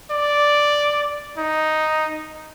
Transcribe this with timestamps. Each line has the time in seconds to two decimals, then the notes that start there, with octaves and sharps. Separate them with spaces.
0.11 D5
1.38 D#4